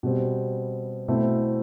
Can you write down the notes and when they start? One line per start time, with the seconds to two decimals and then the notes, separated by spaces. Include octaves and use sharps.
0.03 B2 G3 C4
1.08 B2 A3 C4 E4